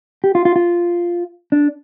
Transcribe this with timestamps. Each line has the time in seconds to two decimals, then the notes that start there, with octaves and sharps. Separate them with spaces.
0.24 G4
0.35 F4
0.45 F4
0.56 F4
1.52 D4